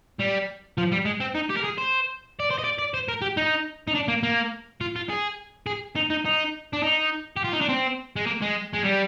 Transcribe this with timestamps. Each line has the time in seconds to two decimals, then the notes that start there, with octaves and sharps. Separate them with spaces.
0.20 G3
0.78 F3
0.92 G3
1.05 G#3
1.20 C4
1.35 D#4
1.49 G4
1.57 A#4
1.64 G#4
1.78 C5
2.40 D5
2.51 C5
2.59 D#5
2.64 D5
2.79 D5
2.94 C5
3.08 A#4
3.22 G4
3.37 D#4
3.88 D#4
3.95 D4
4.08 A#3
4.23 A#3
4.81 F4
4.96 F4
5.09 G#4
5.67 G#4
5.96 D#4
6.10 D#4
6.25 D#4
6.73 D4
6.83 D#4
7.37 G4
7.44 F4
7.53 D#4
7.61 D4
7.69 C4
8.16 G#3
8.26 A#3
8.42 G#3
8.73 G#3
8.84 G3